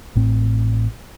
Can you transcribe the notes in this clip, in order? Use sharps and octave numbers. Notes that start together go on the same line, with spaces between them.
A1 A2 C4